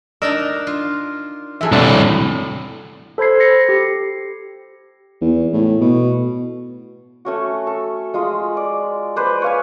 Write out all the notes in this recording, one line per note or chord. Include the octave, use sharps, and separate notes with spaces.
D4 D#4 A#4 D5 D#5 E6
F4
E3 F#3 G#4 A4 E5
C2 A2 D4 D5
A4 C5 B5 G#6 C7
A#6 C7 C#7
G4
E2
A2
B2
A3 C#4 F#4
A4
G#3 F4 D#6
D5
B4 C5 D5
C#5 F5 G#5